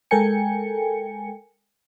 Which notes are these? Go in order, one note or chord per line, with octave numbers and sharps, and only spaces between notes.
G#3 A4 A#4 G5 G#5 C#7